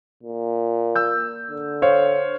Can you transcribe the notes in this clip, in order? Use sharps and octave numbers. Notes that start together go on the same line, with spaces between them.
A#2
E6 G6
D3
C5 C#5 F5